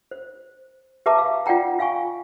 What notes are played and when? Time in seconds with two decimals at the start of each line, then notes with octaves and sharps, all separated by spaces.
0.11 C5
1.06 G4 B4 E5 A5 A#5 D6
1.18 F5
1.46 F4 D5 F#5 G5 A#5
1.79 F4 F5 G#5 C#6